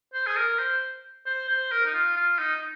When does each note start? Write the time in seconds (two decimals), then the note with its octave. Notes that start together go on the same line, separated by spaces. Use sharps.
0.14 C5
0.27 G#4
0.37 A#4
0.59 C5
1.26 C5
1.49 C5
1.72 A#4
1.86 D#4
1.94 F4
2.17 F4
2.39 D#4
2.56 D#4